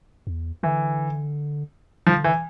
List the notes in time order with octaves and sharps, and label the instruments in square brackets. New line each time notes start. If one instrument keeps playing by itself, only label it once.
[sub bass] E2
[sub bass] D3 [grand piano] E3
[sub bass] D3 [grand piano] F3
[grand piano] E3